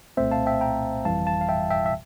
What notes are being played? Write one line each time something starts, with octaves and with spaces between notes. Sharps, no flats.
C2 A#2 A3 C4 C5 E5
F5 A5
E5 G5
G5 A#5
G1 F2 E3 G3 F5 A5
F5 A5
F5
E5 G5
E5 G5
E5